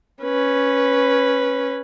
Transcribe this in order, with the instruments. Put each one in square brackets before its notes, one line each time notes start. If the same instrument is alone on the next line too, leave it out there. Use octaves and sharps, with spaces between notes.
[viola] C#4 B4